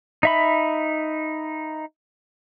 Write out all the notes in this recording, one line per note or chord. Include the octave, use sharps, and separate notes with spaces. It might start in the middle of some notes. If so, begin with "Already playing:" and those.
D#4 E5 B5